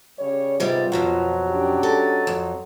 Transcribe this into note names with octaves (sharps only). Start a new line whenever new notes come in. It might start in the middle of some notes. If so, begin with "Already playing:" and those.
C#3 G3 C#5
G#2 C3 G3 B3 F4
F2 B2 F3 F#3
C#4 D4 G4
A4 D#5
F2